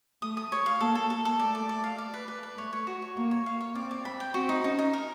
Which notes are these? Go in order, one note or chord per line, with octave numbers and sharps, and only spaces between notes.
A3 D#6
D#6
C#5
F5
A#3 A4
A4
A#3 A4
A4
A3 D5
D5
D5
F5
D5
B4
B4
B4
A3 C#5
C#5
F#4
C#5
A#3 C#5
C#5
F5
C#5
C4 D5
D5
C4 B5
G5
C4 F#4
D#4
C#4 D#4
D#4
A#4